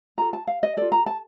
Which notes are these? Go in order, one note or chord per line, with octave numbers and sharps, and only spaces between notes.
F4 A4 A#5
A5
F5
D#5
F4 A4 D5
A#5
A5